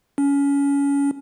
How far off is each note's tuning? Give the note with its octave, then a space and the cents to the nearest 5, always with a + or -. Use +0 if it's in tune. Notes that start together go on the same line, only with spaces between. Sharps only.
C#4 +25